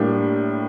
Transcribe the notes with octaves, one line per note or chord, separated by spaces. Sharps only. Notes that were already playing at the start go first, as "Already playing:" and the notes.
Already playing: A2 G3 A#3 D4